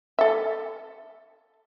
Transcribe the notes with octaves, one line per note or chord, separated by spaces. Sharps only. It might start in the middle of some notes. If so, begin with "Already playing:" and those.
A4 E5